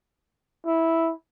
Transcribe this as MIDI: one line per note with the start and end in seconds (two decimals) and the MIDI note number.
0.66 1.12 64